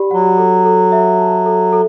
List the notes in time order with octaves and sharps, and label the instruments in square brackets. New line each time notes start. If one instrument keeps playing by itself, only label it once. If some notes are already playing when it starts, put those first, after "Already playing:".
Already playing: [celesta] G4 D5 B5
[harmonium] F#3 [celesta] F#5
[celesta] A4
A4
E5
A5
A4
A4